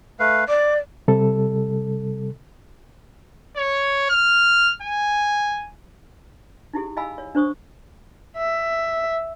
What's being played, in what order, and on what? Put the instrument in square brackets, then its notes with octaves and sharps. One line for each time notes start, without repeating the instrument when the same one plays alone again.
[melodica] A3 B4 F5
[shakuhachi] D5 [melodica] D6
[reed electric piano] C3 G3 A4
[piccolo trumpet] C#5
F6
G#5
[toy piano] D#4 E4 G4 G#4
D#5 F5 G#5 B5 E6
C#5
D4 C5 C#6 D#6
[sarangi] E5